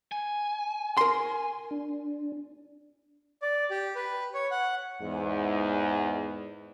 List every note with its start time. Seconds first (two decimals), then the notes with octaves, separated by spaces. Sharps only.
0.12 G#5
0.97 A#4 C6
1.71 D4
3.42 D5
3.71 G4
3.96 B4
4.34 C#5
4.51 F#5
5.01 E2 G#2